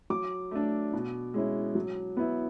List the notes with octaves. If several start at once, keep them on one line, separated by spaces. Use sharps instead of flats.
F#3 D6
A3 D4
B2
G#3 C#4 E4
F#3
B3 E4